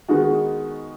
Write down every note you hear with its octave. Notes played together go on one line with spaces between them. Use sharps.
D#3 G#3 B3 D#4 F#4